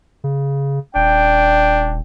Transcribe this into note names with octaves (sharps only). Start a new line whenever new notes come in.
C#3
D#1 D4 G5